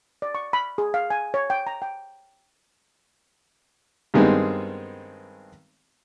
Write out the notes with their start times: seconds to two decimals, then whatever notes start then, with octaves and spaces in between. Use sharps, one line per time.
0.22 D5
0.35 C#6
0.53 B5
0.78 G#4
0.94 F5
1.10 G#5
1.34 C#5
1.50 G5
1.67 A#5
1.82 G5
4.14 G2 D#3 G#3 B3 C4 D#4